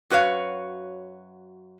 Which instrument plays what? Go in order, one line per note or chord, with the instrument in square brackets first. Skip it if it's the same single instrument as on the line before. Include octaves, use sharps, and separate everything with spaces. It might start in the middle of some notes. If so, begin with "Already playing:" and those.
[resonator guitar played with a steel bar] F#2 F#4 B4 C#5 F5